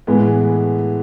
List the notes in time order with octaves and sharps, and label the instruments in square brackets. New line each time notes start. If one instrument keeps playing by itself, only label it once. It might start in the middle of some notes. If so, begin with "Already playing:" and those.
[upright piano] A2 E3 G#3 B3